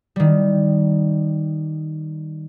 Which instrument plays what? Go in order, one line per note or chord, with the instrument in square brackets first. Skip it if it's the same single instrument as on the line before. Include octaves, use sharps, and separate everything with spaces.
[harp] D#3 G3